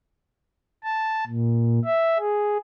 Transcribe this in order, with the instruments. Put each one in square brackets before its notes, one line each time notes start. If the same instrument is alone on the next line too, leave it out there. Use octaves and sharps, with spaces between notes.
[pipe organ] A5
A#2
E5
G#4